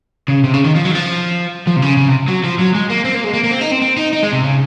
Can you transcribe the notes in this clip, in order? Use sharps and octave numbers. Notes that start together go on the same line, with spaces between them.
C#3
C3
C#3
D#3
F3
F#3
D#3
F3
F3
C3
C#3
C#3
C3
F#3
F3
F#3
G#3
A#3
C4
A#3
G#3
A#3
A#3
C4
D#4
C4
C4
D#4
D#4
G#3
C3
C#3